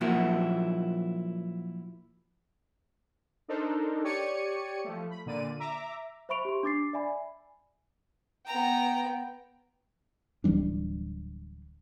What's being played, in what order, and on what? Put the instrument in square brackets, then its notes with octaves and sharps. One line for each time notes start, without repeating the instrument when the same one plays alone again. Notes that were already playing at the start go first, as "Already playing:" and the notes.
[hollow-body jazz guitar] A#2 F3 F#3 A#3 E4 F#4
[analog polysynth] D4 D#4 A4 A#4 C5
G4 C#5 D5 C#6 C#7 D#7
F3 A3
B5
A#2 D3 D5 D#7
E5 A#5 D6
[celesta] C5 E5 B5 C#6 D7 F7
G4 C6
D4 D6 A6 C7
D5 E5 G#5 B5
[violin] B3 G5 [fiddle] A#5
[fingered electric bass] D1 E3 G3 D4